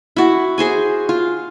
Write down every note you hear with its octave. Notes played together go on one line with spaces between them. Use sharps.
E4 F#4
F#4 G#4 C5 G#5
F4